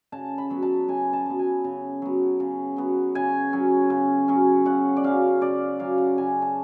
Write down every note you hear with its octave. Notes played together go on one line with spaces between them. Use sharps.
C#3 A5
B5
F#3 B3
A5
C#3 G#5
A5
F#3 B3
G#5
C#3
F#3 B3
C#3
F#3 B3
C#3 G#5
F#3 C#4
C#3
F#3 C#4
C#3 F#5
D5
F#3 C#4 F5
C#3 D5
F#3 C#4 F5
F#5
C#3 G#5
A5